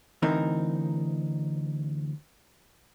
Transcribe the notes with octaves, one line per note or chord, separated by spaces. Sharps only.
D2 E3 C4 D#4 A#4